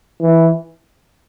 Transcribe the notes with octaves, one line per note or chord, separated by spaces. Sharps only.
E3